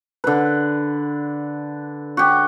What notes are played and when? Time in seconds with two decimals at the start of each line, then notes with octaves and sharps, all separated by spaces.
0.24 D3 B4
2.17 F#4 G4